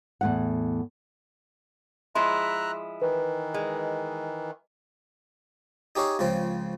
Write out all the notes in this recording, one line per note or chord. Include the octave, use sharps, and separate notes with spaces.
E2 A2 F#5
F3 G#3 E4 E5 A#5 C6 F#6
D#3 E3 B4
G#3
D#4 G4 G#4 C#5 F5
C#2 C#3 F3 C4